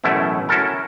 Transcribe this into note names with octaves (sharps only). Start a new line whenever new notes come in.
A1 F#2 B2 A3 C#4 E4
C#4 E4 F#4 A4 A#4